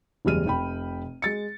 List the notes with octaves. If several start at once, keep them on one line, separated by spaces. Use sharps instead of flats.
F#1 E2 G3 G#3 F6 D#7
F1 G5 B5
G#3 A6 C#7